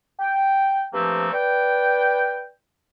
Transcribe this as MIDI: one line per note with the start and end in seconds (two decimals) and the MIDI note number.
0.20 0.86 79
0.94 1.29 43
0.94 1.29 53
0.94 1.29 57
0.94 1.29 58
0.94 1.29 60
1.32 2.47 71
1.32 2.47 74
1.32 2.47 79